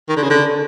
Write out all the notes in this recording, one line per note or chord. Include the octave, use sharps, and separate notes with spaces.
D#3
D3
C#3
D3